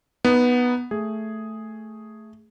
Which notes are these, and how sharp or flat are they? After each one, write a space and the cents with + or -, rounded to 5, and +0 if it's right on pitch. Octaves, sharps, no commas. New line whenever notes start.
B3 -5 D#4 +0
A3 +0 G#4 +0